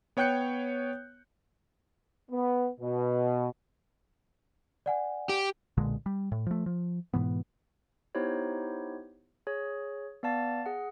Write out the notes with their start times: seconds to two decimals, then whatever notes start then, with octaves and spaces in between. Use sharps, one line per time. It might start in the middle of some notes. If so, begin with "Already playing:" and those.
0.17 B3 C#5 G5 F#6 G6 C#7
2.30 B3
2.79 B2
4.86 D5 F#5 G#5
5.29 G4
5.77 B1 A#2 D3 G#3
6.06 G3
6.32 A2
6.46 F3 A3
6.66 F3
7.14 G#2 B2 E3 B3
8.15 B3 D#4 E4 G4 C5 C#5
9.47 G#4 C#5
10.23 B3 D5 F5 A5 A6
10.66 G#4 F#5